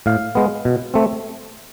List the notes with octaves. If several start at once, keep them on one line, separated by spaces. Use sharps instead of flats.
A2 F5
G#3 B3
B2
A3 C4